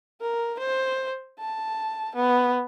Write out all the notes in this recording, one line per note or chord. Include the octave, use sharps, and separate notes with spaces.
A#4
C5
A5
B3